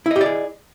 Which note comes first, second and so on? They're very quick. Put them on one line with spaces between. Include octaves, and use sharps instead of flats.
E4 D#5 G4 D5 G#4